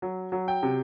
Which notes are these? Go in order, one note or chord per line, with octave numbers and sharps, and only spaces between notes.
F#3
F#3
G5
C3